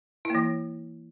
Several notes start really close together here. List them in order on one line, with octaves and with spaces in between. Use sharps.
E4 A#3 E3